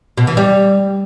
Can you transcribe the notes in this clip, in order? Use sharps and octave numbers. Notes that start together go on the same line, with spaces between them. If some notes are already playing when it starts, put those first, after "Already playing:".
B2
E3
G3